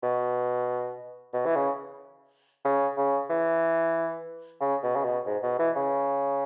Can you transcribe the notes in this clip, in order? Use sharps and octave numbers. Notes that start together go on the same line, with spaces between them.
B2
B2
E3
C#3
C#3
C#3
E3
C#3
B2
C#3
B2
G#2
B2
E3
C#3